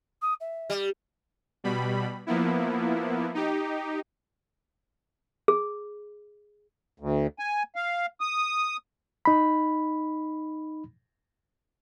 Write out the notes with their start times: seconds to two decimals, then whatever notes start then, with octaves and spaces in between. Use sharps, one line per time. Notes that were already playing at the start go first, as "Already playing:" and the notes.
0.22 D#6
0.41 E5
0.70 G3
1.64 B2 G3 B5
2.27 F3 A#3 B3 E4
3.34 D#4 G4
5.48 G#4
7.00 D2
7.39 G#5
7.75 F5
8.21 D#6
9.25 D#4 B5